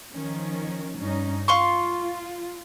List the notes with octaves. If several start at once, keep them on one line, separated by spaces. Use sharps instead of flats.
D#3 F3 C#4
G2 C#4 D#4
F4 F5 C6 C#6